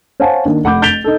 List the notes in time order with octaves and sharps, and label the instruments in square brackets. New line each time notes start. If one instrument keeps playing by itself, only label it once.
[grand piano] C5 C#5 F5 F#5 G#5 A5
D#3 A#3 D4
F1 F#5 B5 D6 G6
G6 A6 B6 D7 F7 G7
D#4 A4